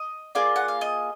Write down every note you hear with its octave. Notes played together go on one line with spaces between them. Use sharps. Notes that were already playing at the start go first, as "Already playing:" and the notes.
Already playing: D#5
A#3 F4 G#4 D5
F#5
F5
D#5